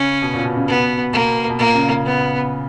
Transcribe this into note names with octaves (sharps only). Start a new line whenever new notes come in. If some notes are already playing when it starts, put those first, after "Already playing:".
Already playing: C#3 C#4
B2
A#2
B2
C#3
B2 B3
B2 A#3
B2
A#2 A#3
C#3
C#3
B3